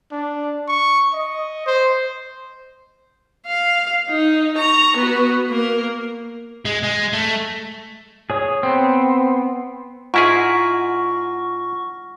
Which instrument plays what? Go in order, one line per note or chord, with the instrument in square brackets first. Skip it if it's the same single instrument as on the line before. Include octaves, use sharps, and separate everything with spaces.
[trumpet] D4
C#6
D#5
C5
[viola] F5
D#4
A#5 C#6
B3 F#4
A#3 A#4
[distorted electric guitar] G#3
G#3
A3
[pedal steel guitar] G#4 C#5 D#6
[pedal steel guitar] B3 [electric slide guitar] C4
[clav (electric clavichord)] G#2 E4 G#4 [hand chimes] F4 [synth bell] F#5 F6 A#6 [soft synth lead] C#6